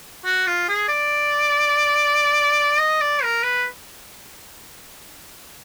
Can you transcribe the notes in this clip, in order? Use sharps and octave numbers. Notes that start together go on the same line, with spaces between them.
F#4
F4
G#4
D5
D#5
D5
A#4
B4